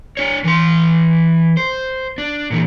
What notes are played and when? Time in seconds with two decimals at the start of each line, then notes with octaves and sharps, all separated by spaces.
0.17 D4 C#5
0.44 E3 C6
1.57 C5
2.18 D4
2.51 A#2 E3